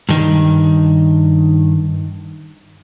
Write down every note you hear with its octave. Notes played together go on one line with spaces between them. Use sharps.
G2 D#3